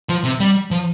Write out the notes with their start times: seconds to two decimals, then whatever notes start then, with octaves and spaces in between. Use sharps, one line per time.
0.09 F3
0.25 C3
0.40 G3
0.71 F3